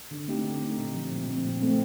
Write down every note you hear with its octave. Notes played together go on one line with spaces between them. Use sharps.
D3
A3 C4 D#4 G4
D3
A3 C4 D#4 G4
A#2
F3 C4
A#2
F3 C4
A#2
A3 C4